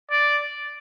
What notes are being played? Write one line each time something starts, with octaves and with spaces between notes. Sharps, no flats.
D5